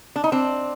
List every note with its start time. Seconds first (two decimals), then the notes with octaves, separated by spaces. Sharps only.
0.16 D4
0.24 D#4
0.32 C4 D4